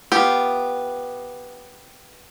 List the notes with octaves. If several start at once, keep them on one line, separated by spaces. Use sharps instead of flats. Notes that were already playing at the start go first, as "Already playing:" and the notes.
B3 F4 G4